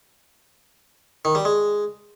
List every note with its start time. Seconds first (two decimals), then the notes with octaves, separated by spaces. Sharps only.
1.25 D#3
1.35 G3
1.45 G#3